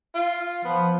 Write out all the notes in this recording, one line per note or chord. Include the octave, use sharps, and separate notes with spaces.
F4
F3 B3